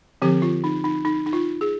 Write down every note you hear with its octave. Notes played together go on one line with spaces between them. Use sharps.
D3 F3 C4 G4
F4
D#4
D#4
D#4
D#4
F4
G#4